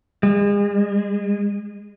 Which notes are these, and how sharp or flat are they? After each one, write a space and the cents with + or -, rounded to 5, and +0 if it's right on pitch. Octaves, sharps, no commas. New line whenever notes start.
G#3 -35